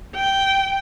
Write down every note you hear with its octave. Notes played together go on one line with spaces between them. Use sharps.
G5